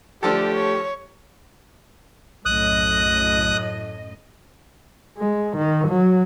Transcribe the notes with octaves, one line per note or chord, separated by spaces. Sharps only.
D3 F3 A3 G4 A4 D5
C#5
B1 F#2 A2 D#5 D#6 F#6
G#3
D#3
F#3